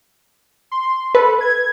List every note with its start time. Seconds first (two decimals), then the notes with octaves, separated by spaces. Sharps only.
0.71 C6
1.15 A4 B4
1.41 G#6